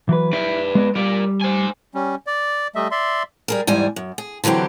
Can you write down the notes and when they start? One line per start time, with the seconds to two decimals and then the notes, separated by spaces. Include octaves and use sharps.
0.09 E3 F#3 B4
0.33 E4 B4 D5
0.75 G#3 B3 D#5
0.96 G3 A#4 D5
1.42 C5 G#5
1.95 G3 C#4
2.27 D5
2.75 G3 A3 D#5 E5
2.91 D5 E5 C6
3.48 G3 G#4 A#4
3.67 E2 G#2 G3 G#5
3.96 F#2
4.18 G#4
4.44 D3 E3 F#3 C4 G4